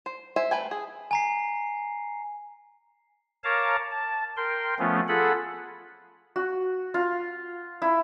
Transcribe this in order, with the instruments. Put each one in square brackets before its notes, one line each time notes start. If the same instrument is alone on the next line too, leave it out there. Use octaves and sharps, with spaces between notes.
[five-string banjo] C5
C5 E5 G#5
A3 B4 G5 G#5
G#4
[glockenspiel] G#5 A#5 C7
[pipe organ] A#4 C#5 F5 A5 A#5 D6
A5
A#4 G5 C6
F3 A3 B3 C#4 F4
F4 G#4 A4 F#5 B5
[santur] F#4
F4
E4